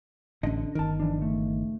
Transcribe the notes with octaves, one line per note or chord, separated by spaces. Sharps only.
A1 D3 C#4 D#5
G1 D#3 A#4 A5
E3 D4
C#2 A3